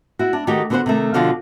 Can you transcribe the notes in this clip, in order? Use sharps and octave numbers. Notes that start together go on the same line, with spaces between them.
E4 F#4
D4
D#3 A3 D#4 F#4 G4
D3 B3 F#4 A4 C5 F#5
C3 D#3 A3
B2 D3 F3 F#4 F5